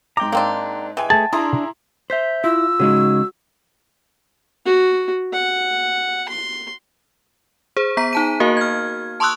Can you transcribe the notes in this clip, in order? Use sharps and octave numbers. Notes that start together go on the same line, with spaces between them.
G#2 G5 A#5 D6
G#2 A#3 C4 D4
E3 G#3 G5 G#5
A3 G#4 A5
D4 E4 G#4 A#5 C6
C5 E5 G6 B6
E4 F4 E6
C#3 G#3 D#4 F#4 C#5
F#4
F#5
C6
G#4 C5
B3 A#5 B6
D#4 A5 D#7
A#3 F#4 A#4 F5
F6 G#6
A5 C6 C#6 D#6 E6 F#6